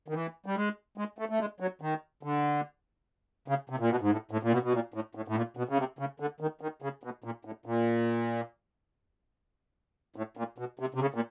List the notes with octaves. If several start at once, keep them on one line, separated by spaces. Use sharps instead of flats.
D#3
E3
G3
G#3
G#3
A3
A3
G#3
F#3
D#3
D3
C#3
C3
A#2
B2
G#2
A2
A2
A#2
B2
B2
A#2
A2
A2
A2
A#2
B2
C#3
C3
C#3
D3
D#3
D#3
C#3
B2
A#2
A2
A#2
A2
A#2
B2
C3
C3
C#3
A#2